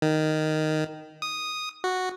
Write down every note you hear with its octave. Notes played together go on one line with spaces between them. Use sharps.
D#3
D#6
F#4